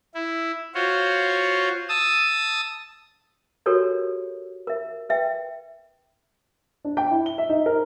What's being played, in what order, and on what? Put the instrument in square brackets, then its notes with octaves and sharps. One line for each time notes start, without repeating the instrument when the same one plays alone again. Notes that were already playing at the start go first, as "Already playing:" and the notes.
[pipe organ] E4
F4 F#4 C5 C#5
A5 D#6 E6
[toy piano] F#4 G4 A4 A#4 C#5 D5
A#4 E5
B4 E5 G5
[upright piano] D4
G5
E4
G7
E5
D#4
A#4